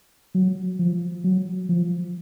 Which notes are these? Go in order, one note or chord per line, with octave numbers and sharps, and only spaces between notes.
F#3
F3
F#3
F3